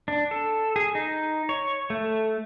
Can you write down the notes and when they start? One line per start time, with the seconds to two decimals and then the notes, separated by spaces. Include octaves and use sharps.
0.08 D4
0.31 A4
0.76 G#4
0.95 D#4
1.49 C#5
1.90 A3